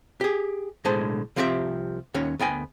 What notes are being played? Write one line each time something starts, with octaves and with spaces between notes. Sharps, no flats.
G4 G#4
B1 A2 D3 G#3 C5 A5
C2 F3 C4 G4 G#4 E5
D#2 D#3 C#4 C#5
D2 B3 G5 G#5